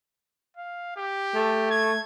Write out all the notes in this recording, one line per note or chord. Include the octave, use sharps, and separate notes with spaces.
F5
G4
A3
G#6